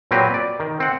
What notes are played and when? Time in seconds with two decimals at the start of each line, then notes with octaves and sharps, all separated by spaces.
0.11 A#2 F#3 C4 G4 B4 A#5
0.34 D5
0.60 D#3
0.80 C4 F#5